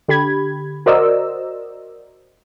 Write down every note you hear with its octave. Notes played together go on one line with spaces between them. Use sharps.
D3 G4 B5 G#6
F#4 A#4 C5 D5 D#5 E6